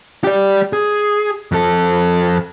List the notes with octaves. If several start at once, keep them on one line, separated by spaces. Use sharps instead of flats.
G4 D5
G#4
F2 A4